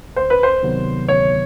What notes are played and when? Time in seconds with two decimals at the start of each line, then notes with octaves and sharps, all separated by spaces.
0.16 D2 C5
0.30 B4
0.43 C5
0.63 C3 D#3 F#3 B3
1.08 D2 C#5